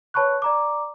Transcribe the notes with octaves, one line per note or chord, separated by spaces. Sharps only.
B4 C#5 A5 B5 C#6 F#6
D5 A#5 D6